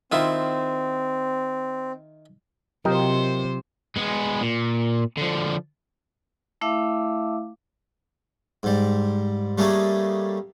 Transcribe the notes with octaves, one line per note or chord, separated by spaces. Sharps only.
D#3 C4 E4 F4
C3 F#3 F4 G4 A#4 C5 D#5 G5
G#3 B3
A#2
D3 F3
A3 E4 E5 F5 D6
G#2 G3
G3 A3 A#3 C#4 G#4